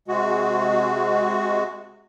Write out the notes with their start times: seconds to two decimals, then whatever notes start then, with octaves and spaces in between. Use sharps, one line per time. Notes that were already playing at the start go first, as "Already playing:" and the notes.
0.08 C3 G#3 F#4